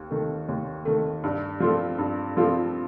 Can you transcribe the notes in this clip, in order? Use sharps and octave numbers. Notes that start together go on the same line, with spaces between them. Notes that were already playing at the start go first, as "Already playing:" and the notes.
Already playing: D#2
D#3 A3
D#2
D#3 A3
G2
F3 C4 F4 A4
G2
F3 C4 F4 A4